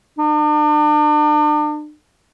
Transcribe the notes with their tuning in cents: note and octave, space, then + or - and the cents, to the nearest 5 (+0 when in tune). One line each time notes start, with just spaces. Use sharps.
D4 +40